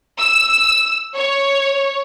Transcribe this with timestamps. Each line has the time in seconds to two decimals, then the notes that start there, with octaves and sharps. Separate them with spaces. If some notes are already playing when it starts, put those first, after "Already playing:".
0.19 E6
1.16 C#5